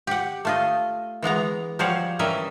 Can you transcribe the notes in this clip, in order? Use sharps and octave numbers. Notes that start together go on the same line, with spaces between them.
G4 F#5
A3 F4 D#5
E3 G#3 B3 A#5
F3 G3 C5 C#5 F5 F#5
E3 G3 C#4 A#4 D#5 E5